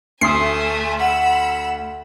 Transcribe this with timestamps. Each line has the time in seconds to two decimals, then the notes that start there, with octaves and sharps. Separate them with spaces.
0.21 D2 A3 G#5 C6 D#6 C7
1.00 F#5 B5 E6